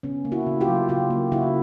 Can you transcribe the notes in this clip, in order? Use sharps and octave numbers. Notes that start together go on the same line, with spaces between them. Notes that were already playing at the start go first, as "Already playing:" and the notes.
C#3 B3 C#4
A#3
E4 F#4
C#3
F4 G4
F#3
C#3 F4 G4
A#3
C#3 E4 F#4